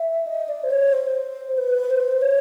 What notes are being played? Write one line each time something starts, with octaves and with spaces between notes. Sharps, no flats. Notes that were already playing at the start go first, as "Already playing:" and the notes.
Already playing: E5
D#5
D5
C5
C#5
C5
B4
C5
C#5